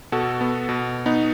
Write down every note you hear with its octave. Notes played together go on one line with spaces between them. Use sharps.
B2 F#4 A4
B3
B2
B3 D#4